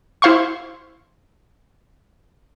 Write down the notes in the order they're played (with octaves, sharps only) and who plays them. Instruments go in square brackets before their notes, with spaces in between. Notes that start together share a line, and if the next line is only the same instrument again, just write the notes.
[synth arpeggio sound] E4 C5 F5 C6 C#6